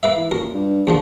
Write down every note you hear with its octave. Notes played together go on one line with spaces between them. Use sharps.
A#3 B4 E5
E3
F#2 A#2 A#4
G2
A#1 E2 D3 F3